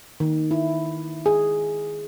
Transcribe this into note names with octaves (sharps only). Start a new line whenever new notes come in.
D#3
E4
G#4